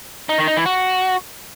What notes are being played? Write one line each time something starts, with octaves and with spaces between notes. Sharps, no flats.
D#4
D#3
D#4
E3
F#4